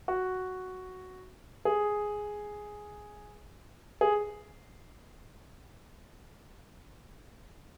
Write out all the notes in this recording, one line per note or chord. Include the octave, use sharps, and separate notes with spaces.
F#4
G#4
G#4